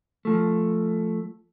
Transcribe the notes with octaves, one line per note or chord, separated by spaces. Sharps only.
F3 A3